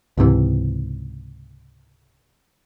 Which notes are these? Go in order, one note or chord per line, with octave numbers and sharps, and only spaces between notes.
C#2 G#2 C3 E3